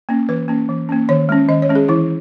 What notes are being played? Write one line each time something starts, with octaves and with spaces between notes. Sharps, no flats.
A#3 C#4
E3 B4
A#3 C#4
E3
A#3 C#4
D#3 C#5
G#3 C#4
D#3 D#5
C#5
G#3 C#4
G#4
E3 E4